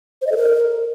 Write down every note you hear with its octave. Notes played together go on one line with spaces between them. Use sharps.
C5
D#5
A4
A#4